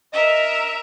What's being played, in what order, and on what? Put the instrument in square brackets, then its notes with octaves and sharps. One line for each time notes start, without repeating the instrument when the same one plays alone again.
[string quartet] A#4 E5 [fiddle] D#5